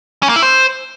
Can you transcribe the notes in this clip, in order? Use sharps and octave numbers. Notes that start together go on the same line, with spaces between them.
C#4
A#3
E4
C5